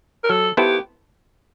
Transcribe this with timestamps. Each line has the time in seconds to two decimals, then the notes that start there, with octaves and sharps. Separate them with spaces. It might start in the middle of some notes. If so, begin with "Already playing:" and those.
0.24 A#4
0.29 F#3 A4
0.57 B3 E4 G4 A4 C5